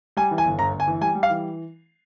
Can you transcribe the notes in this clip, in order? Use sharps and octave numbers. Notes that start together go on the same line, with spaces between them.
G3 G#5
E3
G#5
G1
G1 A#5
G1
G#5
E3
G3 G#5
G3
F5
E3